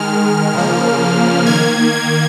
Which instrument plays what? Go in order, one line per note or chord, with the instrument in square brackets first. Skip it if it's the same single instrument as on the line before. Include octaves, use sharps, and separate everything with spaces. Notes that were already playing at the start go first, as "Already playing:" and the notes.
Already playing: [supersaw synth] D#3 G#3 F6
C#3 F3 A#3
D#3 A#3 G#6
G#6